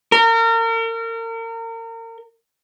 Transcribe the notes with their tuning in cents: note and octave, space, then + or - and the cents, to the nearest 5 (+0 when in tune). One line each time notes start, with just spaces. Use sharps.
A#4 -35